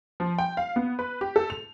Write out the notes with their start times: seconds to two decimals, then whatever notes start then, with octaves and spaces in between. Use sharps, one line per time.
0.20 F3
0.39 G5
0.57 F5
0.76 B3
0.99 B4
1.21 G4
1.36 A4
1.50 F7